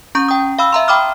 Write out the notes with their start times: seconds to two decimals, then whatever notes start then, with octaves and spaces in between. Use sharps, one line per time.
0.15 C#4 A#5 C#6 G6
0.28 G5 D#6
0.59 F5 B5 E6
0.72 E5 A#5 C6
0.88 G5 B5 D6 D#6 F6